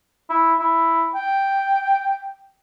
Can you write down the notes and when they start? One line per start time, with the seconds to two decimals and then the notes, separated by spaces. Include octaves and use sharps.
0.29 E4
0.59 E4
1.15 G5